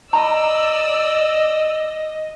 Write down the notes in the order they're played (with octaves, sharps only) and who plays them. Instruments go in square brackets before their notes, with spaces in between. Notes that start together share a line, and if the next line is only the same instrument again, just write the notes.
[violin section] D5 E6 [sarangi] D#5 [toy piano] A#5 B5